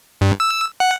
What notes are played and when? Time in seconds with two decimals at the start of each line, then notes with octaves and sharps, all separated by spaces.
0.21 G2
0.40 E6
0.80 F#5